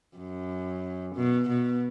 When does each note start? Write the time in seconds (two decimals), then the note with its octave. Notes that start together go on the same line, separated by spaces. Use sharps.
0.17 F#2
1.15 B2
1.48 B2